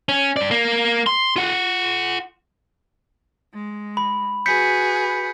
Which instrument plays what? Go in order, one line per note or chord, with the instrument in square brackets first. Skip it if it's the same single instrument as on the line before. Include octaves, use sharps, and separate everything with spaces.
[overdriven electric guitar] C#4
G2 D5
A#3
C6
F4 F#5
[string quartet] G#3
[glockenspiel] B5
[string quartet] F#4 G#4 B4 [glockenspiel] G6 B6 C#7